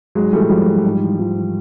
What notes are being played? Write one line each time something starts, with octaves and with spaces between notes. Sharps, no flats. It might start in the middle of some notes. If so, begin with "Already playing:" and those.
G#2 F#3 G#3
E3 G3 A3
G#2 F3 G3
E3
G#2
E3
G#2 F3
E3